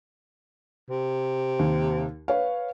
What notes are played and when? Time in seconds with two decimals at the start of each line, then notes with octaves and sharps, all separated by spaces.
0.90 C3
1.59 D#2
2.28 B4 C#5 F5